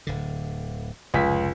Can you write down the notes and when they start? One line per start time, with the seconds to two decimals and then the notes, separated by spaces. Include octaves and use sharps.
0.07 D1 D3
1.14 F1 C#2 G#5 B6